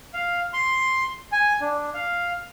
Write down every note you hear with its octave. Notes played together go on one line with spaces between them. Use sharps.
F5
C6
G#5
D4
F5